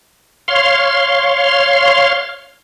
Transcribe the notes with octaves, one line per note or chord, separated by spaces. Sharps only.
C#5 F5 C6